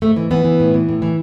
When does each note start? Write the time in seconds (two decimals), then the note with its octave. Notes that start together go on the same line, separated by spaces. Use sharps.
0.02 G#2 A3
0.16 E3
0.31 E3 B3
0.45 E3
0.60 A2
0.74 E3
0.89 A2
1.02 E3